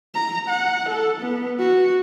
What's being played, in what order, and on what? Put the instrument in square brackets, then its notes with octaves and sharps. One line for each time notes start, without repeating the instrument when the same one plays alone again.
[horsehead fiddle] A#5
F#5
A4
B3
F#4